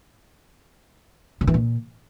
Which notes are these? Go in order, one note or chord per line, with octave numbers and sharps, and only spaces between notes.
C#3
E3
A#2